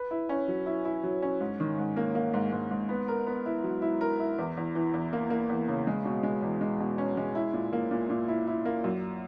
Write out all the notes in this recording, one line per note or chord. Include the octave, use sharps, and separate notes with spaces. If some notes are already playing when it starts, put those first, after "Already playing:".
Already playing: B4
E4
C#4
F#3
E4
E4
F#3
C#4
G#2
D#3
G#2
A#3
A#3
G#2
G#2
G#2
B3
A#4
B3
E4
F#3
E4
A#4
E4
E2
E2
E3
E2
A#3
A#3
E2
C#3
G#3
B2
G#3
E2
G#3
B2
C#4
G#3
E4
A#2
A#3
A#2
A#2
E4
E4
A#3
F#2